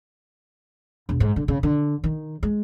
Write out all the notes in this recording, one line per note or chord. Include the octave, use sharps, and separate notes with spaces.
E1
G#2
D3
C#3
D3
D#3
G#3